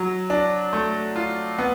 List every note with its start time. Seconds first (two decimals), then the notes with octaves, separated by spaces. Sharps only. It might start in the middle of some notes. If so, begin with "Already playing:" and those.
Already playing: F#3
0.30 D4
0.73 A3
1.16 F4
1.59 B3